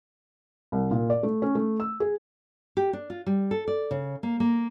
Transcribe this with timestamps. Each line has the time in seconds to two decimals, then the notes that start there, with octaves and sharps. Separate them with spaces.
0.72 C2
0.91 A#2
1.10 D5
1.23 A3
1.42 C#4
1.55 A3
1.80 E6
2.00 G#4
2.77 G4
2.93 D4
3.10 F4
3.26 G3
3.51 A4
3.68 D5
3.91 C#3
4.23 A#3
4.40 A#3